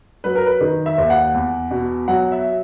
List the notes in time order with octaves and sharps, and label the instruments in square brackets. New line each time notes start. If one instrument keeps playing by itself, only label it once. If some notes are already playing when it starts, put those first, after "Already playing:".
[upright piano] F#3 B4
A#4
B4
D#3
E5
D#2
F#5
E2
B2
F#3 F#5
E5